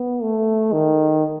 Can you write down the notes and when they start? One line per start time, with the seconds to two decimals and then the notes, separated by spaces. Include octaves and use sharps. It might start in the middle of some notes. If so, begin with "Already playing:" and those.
Already playing: B3
0.23 A3
0.73 D#3